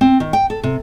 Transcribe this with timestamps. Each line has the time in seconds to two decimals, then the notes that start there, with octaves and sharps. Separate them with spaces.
0.01 C4
0.20 D#3
0.33 G5
0.50 A4
0.63 C3